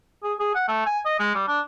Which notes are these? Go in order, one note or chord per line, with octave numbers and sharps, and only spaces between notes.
G#4
G#4
F#5
A3
G#5
D#5
G#3
G3
D4